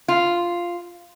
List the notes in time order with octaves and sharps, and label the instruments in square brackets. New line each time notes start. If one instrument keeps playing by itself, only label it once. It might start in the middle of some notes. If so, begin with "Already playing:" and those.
[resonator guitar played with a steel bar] F4